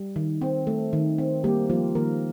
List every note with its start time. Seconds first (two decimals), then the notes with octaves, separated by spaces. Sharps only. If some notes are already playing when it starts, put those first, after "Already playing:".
Already playing: G3
0.16 D#3
0.42 C4
0.67 A3
0.93 D#3
1.18 C4
1.44 G3 A#3 G4
1.70 F3 A#3 F4
1.95 D#3 A#3 A#4